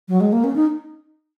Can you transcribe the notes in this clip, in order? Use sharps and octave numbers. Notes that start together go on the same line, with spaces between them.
F#3
G#3
A#3
C#4
D#4